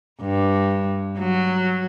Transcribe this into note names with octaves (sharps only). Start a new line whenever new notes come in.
G2
F#3